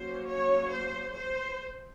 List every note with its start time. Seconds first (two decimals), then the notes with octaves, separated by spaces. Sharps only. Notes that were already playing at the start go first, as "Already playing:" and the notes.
Already playing: F#3 A#3 C#4 C5
0.27 C#5
0.72 C5
1.16 C5